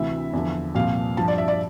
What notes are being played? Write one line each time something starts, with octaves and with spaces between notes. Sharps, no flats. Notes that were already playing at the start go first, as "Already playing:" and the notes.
Already playing: D2 C3 E3 E5
E2 D3 F3
C2 A#2 F3 F5
G2 F3 A5
D5
E5
D5